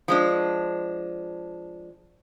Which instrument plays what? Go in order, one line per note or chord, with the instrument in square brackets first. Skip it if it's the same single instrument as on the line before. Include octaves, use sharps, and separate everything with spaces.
[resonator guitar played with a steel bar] F3 G#3 D4